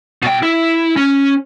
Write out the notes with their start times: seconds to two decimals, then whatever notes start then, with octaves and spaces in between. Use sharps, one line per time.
0.23 B2 G5
0.43 E4
0.96 C#4